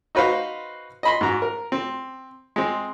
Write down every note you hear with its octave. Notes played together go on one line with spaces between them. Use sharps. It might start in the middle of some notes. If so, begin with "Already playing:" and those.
D#4 F#4 B4 C5 F5
D#5 B5 C6
G#2 F#4 A#5
A#4
C4
G#3 C4